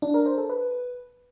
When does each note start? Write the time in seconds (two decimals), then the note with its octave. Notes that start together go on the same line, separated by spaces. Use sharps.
0.02 D4
0.14 A#4
0.26 C5
0.38 A4
0.50 B4